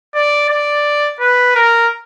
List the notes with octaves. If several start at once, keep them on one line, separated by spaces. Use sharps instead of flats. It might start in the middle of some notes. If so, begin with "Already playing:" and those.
D5
D5
B4
A#4